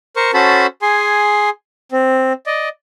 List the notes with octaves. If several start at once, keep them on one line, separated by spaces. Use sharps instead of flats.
A#4 C5 C#6
C#4 F#4 A4 C5 A5 B5
G#4 G#5 C6
C4
D5 D#5